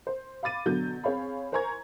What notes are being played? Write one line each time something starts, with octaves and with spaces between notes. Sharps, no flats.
C5
F5 B5 D6 A6 D#7
B2 D3 F#3 G6
C4 G#4 C#5 F5 B5
A#4 C5 G#5 A#5 C#6 G#6